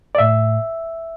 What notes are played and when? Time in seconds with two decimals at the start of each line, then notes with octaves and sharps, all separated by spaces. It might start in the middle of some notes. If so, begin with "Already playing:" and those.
0.15 D5
0.18 A2 E5